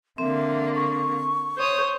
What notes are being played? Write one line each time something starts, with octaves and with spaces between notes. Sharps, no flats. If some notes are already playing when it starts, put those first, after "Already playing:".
D3 A#3 C4 E5
C#6
C5 C#5 D#6